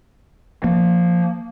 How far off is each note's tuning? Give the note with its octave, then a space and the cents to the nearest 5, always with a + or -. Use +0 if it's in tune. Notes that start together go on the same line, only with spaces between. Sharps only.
F3 +0 A#3 +0